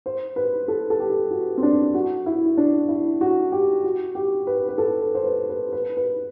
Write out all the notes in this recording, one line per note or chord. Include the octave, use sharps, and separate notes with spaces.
C5
B4
A4
A4
G4
F#4
C4
D4
F#4
E4
D4
E4
F#4
G4
F#4
G4
B4
B4
A4
B4
C5
B4
B4
B4
B4